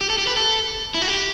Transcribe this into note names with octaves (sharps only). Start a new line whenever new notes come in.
G4
A4
G4
B4
A4
E4
F#4
G4